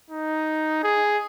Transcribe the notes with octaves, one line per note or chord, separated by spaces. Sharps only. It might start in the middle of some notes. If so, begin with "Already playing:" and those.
D#4
G#4